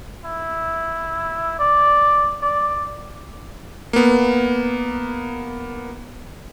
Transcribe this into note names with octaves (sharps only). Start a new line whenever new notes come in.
E4
D5
D5
A#3 B3